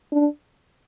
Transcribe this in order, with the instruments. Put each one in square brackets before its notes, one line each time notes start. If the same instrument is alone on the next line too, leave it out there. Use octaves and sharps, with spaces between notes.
[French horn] D4